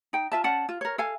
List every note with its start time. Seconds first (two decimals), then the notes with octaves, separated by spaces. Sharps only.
0.13 D#4 G5
0.32 F4 E5 A5
0.44 C#4 D5 F#5 A5
0.69 F4
0.81 A#4 C#5
0.98 A4 F5 G#5